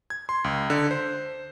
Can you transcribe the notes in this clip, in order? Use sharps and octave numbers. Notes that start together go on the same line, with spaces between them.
G#6
C6
C#2
D3
C5